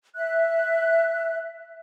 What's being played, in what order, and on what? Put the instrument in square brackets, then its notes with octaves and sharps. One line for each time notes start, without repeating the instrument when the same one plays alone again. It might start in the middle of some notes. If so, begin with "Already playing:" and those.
[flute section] E5 F#6